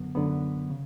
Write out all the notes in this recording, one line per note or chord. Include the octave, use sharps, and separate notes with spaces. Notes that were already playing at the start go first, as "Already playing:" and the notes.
Already playing: F#2 D3 F#3 B3
F#2 D3 F#3 B3
C#3